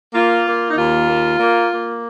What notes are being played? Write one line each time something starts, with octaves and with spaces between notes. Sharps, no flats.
A#3 F4
A#3
D#4
D#2 F4
A#3
A#3
A#3